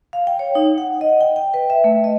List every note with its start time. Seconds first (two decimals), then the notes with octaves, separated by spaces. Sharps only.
0.13 F5
0.27 G5
0.39 C#5
0.55 D#4
0.78 F#5
1.01 D#5
1.21 G5
1.36 G5
1.54 B4
1.70 E5
1.84 A3
2.04 D#5